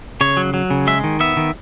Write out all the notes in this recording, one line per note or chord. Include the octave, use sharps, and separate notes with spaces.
C#3 C#5
F#3
F#3
C#3
G#3 E5
D#3
B3 E5
D#3